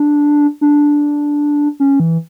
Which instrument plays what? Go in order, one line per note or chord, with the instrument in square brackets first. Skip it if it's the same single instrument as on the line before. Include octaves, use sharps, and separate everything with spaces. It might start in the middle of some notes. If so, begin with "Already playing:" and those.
Already playing: [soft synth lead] D4
D4
C#4
E3